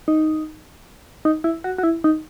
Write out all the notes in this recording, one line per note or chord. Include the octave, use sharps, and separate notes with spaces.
D#4
D#4
E4
F#4
F#4
E4
D#4